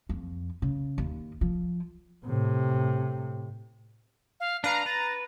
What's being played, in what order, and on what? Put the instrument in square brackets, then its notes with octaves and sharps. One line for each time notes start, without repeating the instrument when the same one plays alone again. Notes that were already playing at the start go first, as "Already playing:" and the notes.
[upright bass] F2
C#3
D#2
F3
[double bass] A2 C3
[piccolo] F5
[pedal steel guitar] D4 B4 [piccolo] F5 [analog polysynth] A#5
[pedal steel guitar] B4 [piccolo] A6